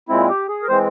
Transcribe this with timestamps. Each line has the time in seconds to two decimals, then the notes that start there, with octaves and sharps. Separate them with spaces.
0.09 A#2 G#3 C4 E4
0.29 G4
0.48 G#4
0.63 A#4
0.68 E3 G#3 C4 C5